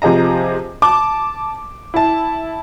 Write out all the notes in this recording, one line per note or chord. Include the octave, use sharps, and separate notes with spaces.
C3 F3 G#4 D#5 A#5
A5 D6
E4 A5